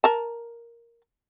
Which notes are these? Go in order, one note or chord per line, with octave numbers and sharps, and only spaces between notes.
A#4 A5